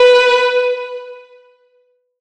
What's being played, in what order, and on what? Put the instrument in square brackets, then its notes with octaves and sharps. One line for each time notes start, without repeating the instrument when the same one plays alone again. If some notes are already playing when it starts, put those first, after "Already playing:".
Already playing: [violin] B4